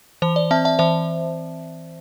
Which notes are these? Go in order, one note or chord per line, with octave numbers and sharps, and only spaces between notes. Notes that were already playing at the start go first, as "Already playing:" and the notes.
E3 C5
D5
C4 E5 A5
E5 A5
E3 C5 E5